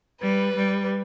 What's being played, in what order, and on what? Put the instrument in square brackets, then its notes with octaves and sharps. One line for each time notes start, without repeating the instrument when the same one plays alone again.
[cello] G3 [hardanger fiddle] B4
[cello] G3